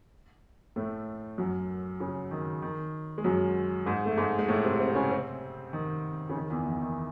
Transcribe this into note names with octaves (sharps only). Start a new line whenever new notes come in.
A2 A3
F#2 F#3
C#3
D#3
D#3
G#3
F#2 F#3
G#2 G#3
A3
G#2 G#3
G#3
A2 A3
C3 C4
C3 C4
C#3 C#4
C3 C4
D#3
C#3
D#3
E2 E3
E2 E3
E3
D#3